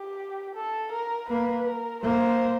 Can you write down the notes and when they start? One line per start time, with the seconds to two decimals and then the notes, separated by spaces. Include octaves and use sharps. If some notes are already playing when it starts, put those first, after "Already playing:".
Already playing: G4
0.55 A4
0.92 A#4
1.29 A#3 B4
1.66 A#4
2.03 A#3 C5